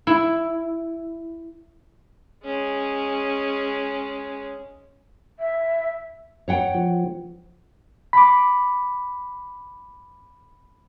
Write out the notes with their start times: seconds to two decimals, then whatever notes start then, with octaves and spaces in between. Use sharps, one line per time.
0.07 E4
2.44 G#3 C#4
5.39 E5
6.48 C#5 F#5 G5
6.74 F3
8.13 B5 D6